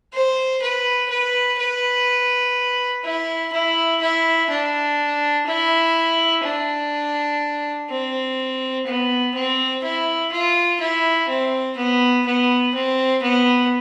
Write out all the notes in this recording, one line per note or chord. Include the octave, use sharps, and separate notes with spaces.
C5
B4
B4
B4
E4
E4
E4
D4
E4
D4
C4
B3
C4
E4
F4
E4
C4
B3
B3
C4
B3